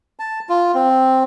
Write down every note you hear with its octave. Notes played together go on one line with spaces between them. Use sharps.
A5
F4
C4